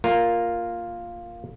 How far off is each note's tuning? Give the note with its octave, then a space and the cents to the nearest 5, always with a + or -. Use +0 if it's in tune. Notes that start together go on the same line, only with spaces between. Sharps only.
A#3 +0 F4 +0 A#4 +0